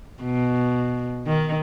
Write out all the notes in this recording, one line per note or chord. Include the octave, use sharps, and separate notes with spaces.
B2
D#3